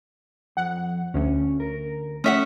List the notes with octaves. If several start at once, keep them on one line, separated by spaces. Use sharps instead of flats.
F2 F#5
D2 C#4 C#5
A#4
A3 C#4 E5 F#5 D#6